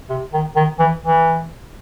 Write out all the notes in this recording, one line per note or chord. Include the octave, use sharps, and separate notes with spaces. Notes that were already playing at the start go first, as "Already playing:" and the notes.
C3
D#3
D#3
E3
E3